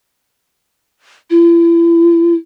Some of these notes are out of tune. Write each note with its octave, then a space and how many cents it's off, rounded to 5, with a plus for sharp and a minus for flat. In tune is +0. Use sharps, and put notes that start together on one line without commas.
E4 +40